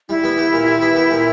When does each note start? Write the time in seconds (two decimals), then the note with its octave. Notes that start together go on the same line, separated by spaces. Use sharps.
0.09 G3 E4
0.24 B3
0.38 G4
0.53 A#2
0.67 G3
0.81 B3
0.96 G4
1.11 A#2